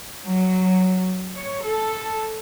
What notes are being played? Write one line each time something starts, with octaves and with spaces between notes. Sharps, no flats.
F#3
C#5
A4